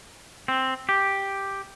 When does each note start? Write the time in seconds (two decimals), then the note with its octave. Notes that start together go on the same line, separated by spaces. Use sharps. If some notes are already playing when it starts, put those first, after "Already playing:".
0.48 C4
0.89 G4